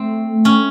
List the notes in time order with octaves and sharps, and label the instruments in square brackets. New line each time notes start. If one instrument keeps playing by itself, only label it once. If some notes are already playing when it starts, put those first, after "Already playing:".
Already playing: [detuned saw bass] A3 [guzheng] C4
[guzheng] C#4